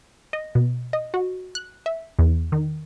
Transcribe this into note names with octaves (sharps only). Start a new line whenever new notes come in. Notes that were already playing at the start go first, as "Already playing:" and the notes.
D#5
B2
D#5
F#4
F#6
E5
E2
D#3